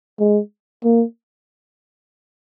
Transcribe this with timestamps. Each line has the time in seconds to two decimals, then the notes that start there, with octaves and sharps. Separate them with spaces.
0.20 G#3
0.84 A#3